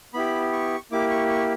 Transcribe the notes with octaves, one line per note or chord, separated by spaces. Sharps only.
B3 E4 G4 B5
C#6
A#3 E4 G4 D6
C#6
C#6